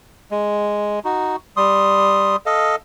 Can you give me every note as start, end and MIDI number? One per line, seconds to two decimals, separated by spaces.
0.31 0.99 56
1.05 1.36 63
1.05 1.36 66
1.57 2.36 55
1.57 2.36 84
1.57 2.36 87
2.46 2.76 69
2.46 2.76 75
2.46 2.76 77